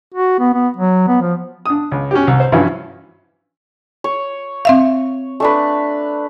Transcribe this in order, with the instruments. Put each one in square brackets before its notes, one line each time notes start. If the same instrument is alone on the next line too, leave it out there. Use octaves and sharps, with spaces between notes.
[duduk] F#4
B3
B3
F#3
B3
F3
[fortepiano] D4 D#6
C#2
C#4 F#4 G4
C2
C5
G2 E3 F3 C#4 E4 F#4
[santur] C#5
[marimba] C4 E5 F5
[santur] A3 D4 B4